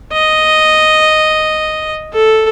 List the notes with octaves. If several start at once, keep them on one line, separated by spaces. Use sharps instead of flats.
D#5
A4